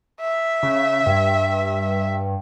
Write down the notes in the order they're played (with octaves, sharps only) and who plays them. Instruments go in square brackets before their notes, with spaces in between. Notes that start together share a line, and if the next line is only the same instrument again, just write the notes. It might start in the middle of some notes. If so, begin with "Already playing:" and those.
[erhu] E5
[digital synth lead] C#3
G2